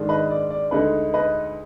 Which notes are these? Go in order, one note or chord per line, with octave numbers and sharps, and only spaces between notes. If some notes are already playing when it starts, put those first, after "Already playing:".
Already playing: G#2 D#3 G#3 D4
B4 D#5
D5
D5
D2 D3 G#3 D#4 B4
B4 D#5